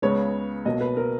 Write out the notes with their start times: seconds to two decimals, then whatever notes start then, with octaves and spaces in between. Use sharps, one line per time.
0.02 C#2 C#3 G#3 B3 C#5
0.65 B1 B2 A#3 D#5
0.81 B4
0.97 A#4